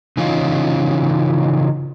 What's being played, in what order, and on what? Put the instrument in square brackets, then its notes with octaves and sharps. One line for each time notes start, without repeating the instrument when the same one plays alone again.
[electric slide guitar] C#3 E3 C#4 D#4 F4